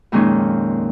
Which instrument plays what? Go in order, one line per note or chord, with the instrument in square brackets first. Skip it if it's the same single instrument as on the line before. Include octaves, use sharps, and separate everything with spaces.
[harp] F2 A#2 D#3 G#3 C#4 D#4